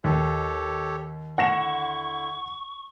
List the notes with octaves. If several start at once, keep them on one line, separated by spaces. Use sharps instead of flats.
D#2 G4 A4 C#5
D3 E4 F#5 C#6 A#6 E7